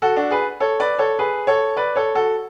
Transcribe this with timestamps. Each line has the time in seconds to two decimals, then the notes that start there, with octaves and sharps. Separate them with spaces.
0.02 F#4 A4
0.16 D4 F#4
0.31 G#4 B4
0.60 A4 C#5
0.80 B4 D5
0.99 A4 C#5
1.19 G#4 B4
1.47 A4 C#5
1.77 B4 D5
1.96 A4 C#5
2.15 F#4 A4